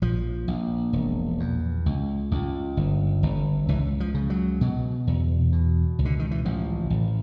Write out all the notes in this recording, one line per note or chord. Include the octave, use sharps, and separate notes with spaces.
A#1 F3
A#1
E1
E2
C#2
C#2
G1
G1
C#2 E3
F3
C#3
F#3
B2
E2
B2
C#2
D3
D#3
E3
A1 F3
A1